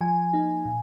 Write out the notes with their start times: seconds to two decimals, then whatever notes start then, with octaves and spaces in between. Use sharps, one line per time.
0.01 F3 G#5
0.33 A#3 D#4
0.65 A#2